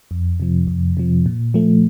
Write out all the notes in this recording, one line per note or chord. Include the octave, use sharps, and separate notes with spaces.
F2
C3 F3
F2
C3 F3
A#2
F3 A3